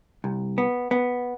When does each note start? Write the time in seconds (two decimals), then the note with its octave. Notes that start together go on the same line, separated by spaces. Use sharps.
0.24 C2
0.58 B3
0.91 B3